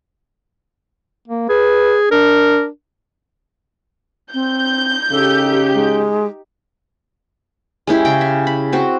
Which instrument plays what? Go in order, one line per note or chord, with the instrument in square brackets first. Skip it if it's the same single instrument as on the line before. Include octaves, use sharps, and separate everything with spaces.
[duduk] A#3
[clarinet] G#4 [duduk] B4
[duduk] D4 [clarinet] A#4
[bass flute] C4 [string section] G6
[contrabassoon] C#3 [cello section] D#4 G4 [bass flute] A4
[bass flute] G#3
[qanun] G#3 C#4 E4 G4
C#3 G5
E5
B5
C4 F#4 C5